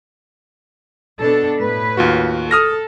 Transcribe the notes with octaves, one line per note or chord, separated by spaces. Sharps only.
B2 D4 A4
A2 B4
D#2 F4 F#4
A4 D#6 F6 A#6